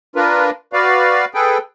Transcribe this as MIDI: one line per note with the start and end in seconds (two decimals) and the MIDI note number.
0.16 0.50 62
0.16 0.50 65
0.16 0.50 70
0.16 0.50 71
0.73 1.25 66
0.73 1.25 71
0.73 1.25 74
0.73 1.25 77
1.34 1.58 68
1.34 1.58 69
1.34 1.58 71
1.34 1.58 79